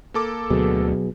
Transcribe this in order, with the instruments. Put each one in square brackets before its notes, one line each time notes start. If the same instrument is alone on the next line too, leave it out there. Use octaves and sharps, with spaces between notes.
[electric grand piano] A#3 A4 D6
[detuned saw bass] D2 [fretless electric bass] B2 [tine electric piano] F#3 G#4